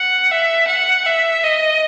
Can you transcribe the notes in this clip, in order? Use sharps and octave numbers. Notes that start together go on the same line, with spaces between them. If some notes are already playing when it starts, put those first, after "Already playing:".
Already playing: F#5
E5
F#5
E5
D#5